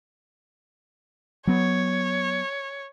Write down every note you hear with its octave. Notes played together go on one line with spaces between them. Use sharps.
F#3 B3 C#5